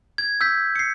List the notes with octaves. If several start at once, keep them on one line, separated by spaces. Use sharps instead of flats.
G#6
E6 G6 B6
C7 C#7